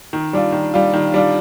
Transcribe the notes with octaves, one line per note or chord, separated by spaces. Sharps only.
D#3
G3 D4 F4
D#3
G3 D4 F4
D#3
G3 D4 F4